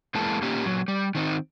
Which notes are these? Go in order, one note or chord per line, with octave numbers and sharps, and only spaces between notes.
E2 E3 G#3 A#3 A5
A#3 C#4 D#4 G4
A#2 F#3
G3
D#3 C4 D#4